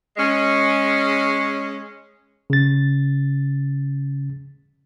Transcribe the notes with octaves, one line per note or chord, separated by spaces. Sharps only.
G#3 C#4
C#3 A6